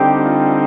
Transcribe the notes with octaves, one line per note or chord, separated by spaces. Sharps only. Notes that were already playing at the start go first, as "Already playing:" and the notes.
Already playing: D3 G3 C4 D#4 G4
F4